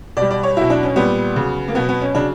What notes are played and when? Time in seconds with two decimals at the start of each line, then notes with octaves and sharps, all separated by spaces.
0.17 B2 G3 D5
0.31 D5
0.43 C#5
0.56 B2 F#3 E4
0.70 D4
0.83 C#4
0.96 A#2 G3 B3
1.36 C#3 F#3
1.68 A#3
1.75 B2 F#3 B3
1.89 B3
2.01 C#4
2.15 C#3 F#3 D4